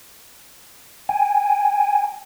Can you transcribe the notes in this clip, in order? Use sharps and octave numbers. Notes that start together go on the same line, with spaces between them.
G5 G#5